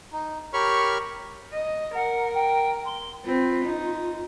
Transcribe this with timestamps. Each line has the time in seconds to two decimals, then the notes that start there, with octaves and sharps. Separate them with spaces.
0.13 D#4
0.53 G4 A#4 C#5 B5 C#6 F6
1.53 D#5
1.94 A#4 F#5
2.34 G5
2.85 C6
3.25 C4 F4 B4
3.65 D#4